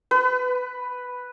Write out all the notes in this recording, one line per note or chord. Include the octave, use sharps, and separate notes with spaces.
B4